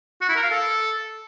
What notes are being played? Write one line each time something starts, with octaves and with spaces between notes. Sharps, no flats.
F#4
E4
A#4
F5
A4